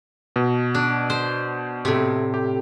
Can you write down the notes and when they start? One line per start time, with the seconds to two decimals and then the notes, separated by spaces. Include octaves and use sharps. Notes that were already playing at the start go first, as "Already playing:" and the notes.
0.36 B2
0.75 D4
1.10 C5
1.85 A2 C3
2.34 G4